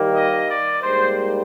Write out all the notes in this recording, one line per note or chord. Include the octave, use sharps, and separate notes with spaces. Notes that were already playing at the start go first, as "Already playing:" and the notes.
Already playing: D#2 D#3 G3 A#3
D#5
D5
G#2 G3 A#3 C5